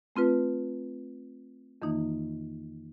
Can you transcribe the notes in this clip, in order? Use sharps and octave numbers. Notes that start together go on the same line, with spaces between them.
A3 C4 F4 B4
F2 D#3 E3 A#3 D#4